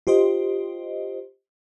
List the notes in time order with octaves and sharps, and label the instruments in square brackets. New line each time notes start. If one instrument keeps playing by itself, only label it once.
[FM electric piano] F4 G4 C5 D#5